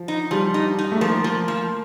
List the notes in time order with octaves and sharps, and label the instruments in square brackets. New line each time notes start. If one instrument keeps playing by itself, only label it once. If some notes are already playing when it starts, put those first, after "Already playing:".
Already playing: [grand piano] F3
[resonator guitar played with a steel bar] D#4
[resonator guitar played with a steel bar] F3 [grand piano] G3
[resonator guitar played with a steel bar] D#4
D#4
[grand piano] A3
[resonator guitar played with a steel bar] F3 [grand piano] A#3
[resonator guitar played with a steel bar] F3
F3